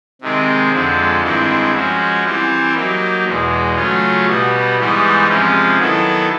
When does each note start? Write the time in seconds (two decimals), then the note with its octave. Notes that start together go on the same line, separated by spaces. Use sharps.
0.21 C3 D#3 G#3 C4
0.72 F2 D3 F3 G#3
1.23 G2 D#3 G#3 C4 E4
1.74 F3 G#3 C#4 F#4
2.24 E3 G3 C4 E4 G4
2.75 F#3 A#3 D#4 G4
3.25 E2 B2 G#3
3.75 C#3 F#3 A3 C#4 F4
4.26 B2 G3 B3
4.77 G#2 E3 G3 B3 D#4
5.28 C3 F3 G#3 C#4
5.78 D#3 F#3 B3 E4 A4